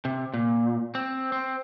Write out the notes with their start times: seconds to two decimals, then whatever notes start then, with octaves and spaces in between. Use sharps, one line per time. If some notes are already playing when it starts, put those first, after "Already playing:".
0.05 C3
0.34 A#2
0.95 C4
1.32 C4